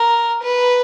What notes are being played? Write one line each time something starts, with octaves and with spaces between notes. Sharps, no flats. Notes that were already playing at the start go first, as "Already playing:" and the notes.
Already playing: A#4
B4